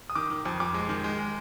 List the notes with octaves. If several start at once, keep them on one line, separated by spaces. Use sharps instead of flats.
D#6
D#3 D6
D#3
F2
F2 D6
G#3
D#3
G#3
G#3